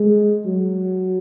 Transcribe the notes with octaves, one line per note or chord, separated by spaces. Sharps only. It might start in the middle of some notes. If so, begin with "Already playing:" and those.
Already playing: G#3
F#3